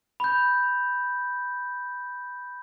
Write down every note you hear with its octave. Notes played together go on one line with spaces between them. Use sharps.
B5 G6